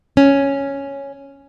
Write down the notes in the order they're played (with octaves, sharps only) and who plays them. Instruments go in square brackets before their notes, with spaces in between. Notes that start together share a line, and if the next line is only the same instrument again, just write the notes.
[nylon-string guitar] C#4